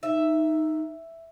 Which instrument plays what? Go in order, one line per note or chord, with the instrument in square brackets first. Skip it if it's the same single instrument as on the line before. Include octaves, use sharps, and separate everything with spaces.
[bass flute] D#4 [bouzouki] E5